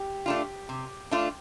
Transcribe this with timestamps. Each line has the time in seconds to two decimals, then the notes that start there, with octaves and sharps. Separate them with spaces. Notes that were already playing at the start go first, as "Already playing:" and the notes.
Already playing: G4
0.26 A3 D4 F4
0.69 C3
1.11 A3 D4 F4